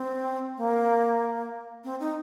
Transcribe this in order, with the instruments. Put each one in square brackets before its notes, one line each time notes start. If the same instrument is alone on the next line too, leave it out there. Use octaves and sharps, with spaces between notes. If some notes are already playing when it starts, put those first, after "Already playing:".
Already playing: [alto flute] C4
A#3
C4
D#4